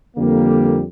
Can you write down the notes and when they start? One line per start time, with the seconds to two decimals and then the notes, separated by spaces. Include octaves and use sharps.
0.17 F2 D3 G3 A#3